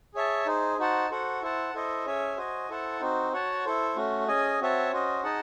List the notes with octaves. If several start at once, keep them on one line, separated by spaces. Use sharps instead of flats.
G#4 C#5 E5 A5
D#4 G#4 C5
D#4 F#4 C5 F#5 A5
F#4 A4 C5 F#5
E4 C5 F#5 A5
E4 A4 C5 D#5
C#4 G#4 C#5 E5 G#5
F#4 C5 D#5 G#5
E4 A4 C5 F#5 A5
C4 D#4 F#4 C5
F#4 C#5 F#5 A5
E4 A4 C5
A3 C#4 F#4
C#4 G#4 D#5 G#5
C4 F#4 C#5 E5 A5
C#4 F#4 C5 D#5
D#4 G#4 D#5 F#5 A5